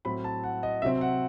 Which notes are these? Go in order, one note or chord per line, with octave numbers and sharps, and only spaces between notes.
A2 F#3 C4 E4 B5
A5
F#5
D#5
C3 F#3 C4 E5
F#5